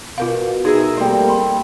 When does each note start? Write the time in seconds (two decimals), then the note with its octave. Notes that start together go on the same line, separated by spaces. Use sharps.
0.18 B2 F4 A#4 F5
0.65 D#4 G#4 A#4 E5
0.97 G3 A3 A#3 C4 A4 G5
1.28 G5 B5 C6